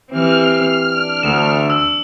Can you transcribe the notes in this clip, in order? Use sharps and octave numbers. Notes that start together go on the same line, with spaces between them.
E3 C4 G4 F6
D4
D2 E7
E6